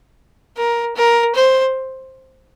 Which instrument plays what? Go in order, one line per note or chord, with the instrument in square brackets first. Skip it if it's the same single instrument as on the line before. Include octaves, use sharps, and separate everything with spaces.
[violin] A#4
A#4
C5